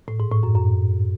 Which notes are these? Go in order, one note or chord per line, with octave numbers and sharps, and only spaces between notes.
A2
G#2
A2
F#2
F#2